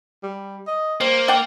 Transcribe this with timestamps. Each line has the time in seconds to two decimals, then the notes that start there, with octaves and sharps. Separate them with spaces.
0.23 G3
0.67 D#5
1.01 G3 A#3 C5
1.28 D5 F#5 G5